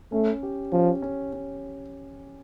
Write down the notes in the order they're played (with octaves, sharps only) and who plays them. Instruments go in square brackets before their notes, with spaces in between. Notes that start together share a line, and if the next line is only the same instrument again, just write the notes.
[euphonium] A3 [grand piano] C#4
[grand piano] G4
[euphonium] F3 [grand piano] C#4
[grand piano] C#4
C#4